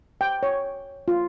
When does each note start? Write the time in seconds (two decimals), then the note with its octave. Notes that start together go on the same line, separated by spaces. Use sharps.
0.21 G5
0.43 C#5
1.08 F4